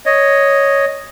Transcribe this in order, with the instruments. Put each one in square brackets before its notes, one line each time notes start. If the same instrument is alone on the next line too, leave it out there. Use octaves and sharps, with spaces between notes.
[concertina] C#5 D#5